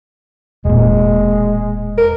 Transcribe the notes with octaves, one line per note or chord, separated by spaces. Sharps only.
E1 A#2 G#3
A#4